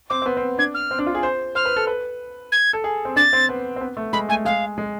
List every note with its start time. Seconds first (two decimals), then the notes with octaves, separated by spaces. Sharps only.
0.10 C4 D6
0.22 C4
0.26 B3
0.37 C4
0.58 D4 G#6
0.74 F6
0.91 C4
0.99 D4
1.07 F4
1.15 G#4
1.23 C5
1.55 C5 F6
1.65 B4
1.76 A4
1.87 B4
2.52 G#6
2.73 A4
2.84 G#4
3.05 C4
3.16 D4 A6
3.33 C4
3.49 B3
3.76 C4
3.81 B3
3.97 A3
4.13 G#3 B5
4.29 A3 G#5
4.45 G#3 F5
4.78 G#3